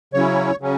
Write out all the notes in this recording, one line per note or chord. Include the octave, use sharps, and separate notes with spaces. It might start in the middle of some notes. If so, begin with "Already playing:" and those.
C#3 F#3 C#4 E4 C#5
C#3 F#3 C#4